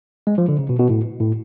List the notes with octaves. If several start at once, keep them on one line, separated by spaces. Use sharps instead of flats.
G#3
F3
D3
C#3
B2
B2
A2
A2